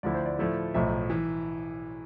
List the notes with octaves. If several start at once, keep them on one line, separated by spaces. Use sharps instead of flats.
D2 D3 F3 A3 E4 D5
C5
D5
A2 F3 A3 E4
B1 A2 F3 E5
E3